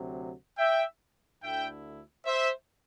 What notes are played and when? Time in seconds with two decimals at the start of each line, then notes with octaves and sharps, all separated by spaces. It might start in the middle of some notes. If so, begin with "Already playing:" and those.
Already playing: D2 C3 F#3
0.58 E5 G5
1.42 D2 D3 A3 E4 E5 G5
2.25 C5 E5